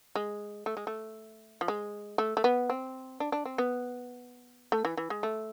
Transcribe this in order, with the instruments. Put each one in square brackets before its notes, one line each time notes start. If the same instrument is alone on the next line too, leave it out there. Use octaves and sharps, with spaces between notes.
[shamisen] G#3
A3
G#3
A3
F3
G#3
A3
A3
B3
C4
D4
D4
C4
B3
A3
E3
E3
G#3
A3